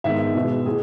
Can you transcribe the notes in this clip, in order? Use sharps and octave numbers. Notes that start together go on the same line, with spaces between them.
G#2 D#3 G#3 B3 E5
B2 G#3 B3
A2 G#4